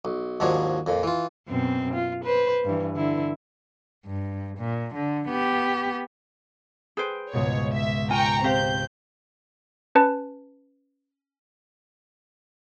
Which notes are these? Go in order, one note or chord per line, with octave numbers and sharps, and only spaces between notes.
B1
D#2 G#2 F3 F#3 D4
F2 A#2
E3 F4
F#2 B2 C4
F4
B4 C5
G2 E3
D3 E4
G2
A#2
D3
B3 G4
G#4 B4 C5 G5 D7
C#2 G#2 B2 C#5
E5
F4 G5 G#5 A#5 C#6
C4 G4 F5 G6
C#4 B4 A5